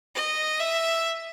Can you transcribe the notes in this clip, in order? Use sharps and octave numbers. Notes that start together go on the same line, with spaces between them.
D#5
E5